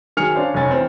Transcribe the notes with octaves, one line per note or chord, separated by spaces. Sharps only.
D#3 F#3 G#4 F6 C#7 F7
C#4 D4 C5 F5
F1 F#2 C#5 G#5 A6
E3 C4